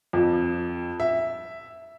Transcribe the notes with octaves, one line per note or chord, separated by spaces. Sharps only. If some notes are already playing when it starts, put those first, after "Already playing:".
F2
E5